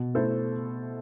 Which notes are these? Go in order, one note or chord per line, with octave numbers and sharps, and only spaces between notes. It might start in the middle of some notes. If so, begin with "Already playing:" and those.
Already playing: B2
A3 E4 A4 C5